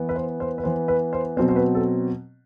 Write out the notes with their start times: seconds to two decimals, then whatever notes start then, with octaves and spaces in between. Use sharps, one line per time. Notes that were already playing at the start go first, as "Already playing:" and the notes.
Already playing: E3 B3
0.09 B4
0.16 C5
0.40 C5
0.58 B4
0.64 E3 B3 C5
0.88 B4
1.13 C5
1.37 B2 F#3 C4 C5
1.49 C5
1.56 B4
1.75 A4